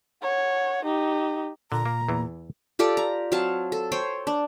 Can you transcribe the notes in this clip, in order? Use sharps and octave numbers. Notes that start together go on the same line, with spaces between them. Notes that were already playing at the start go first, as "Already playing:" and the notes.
C#5 F#5
D#4 G4
A#2 D3 A#5
A#3
E2 E3
F4 G4 A4 D5
A#5
F#3 C4 F5 A5
A4
C5 C#5 G5
D4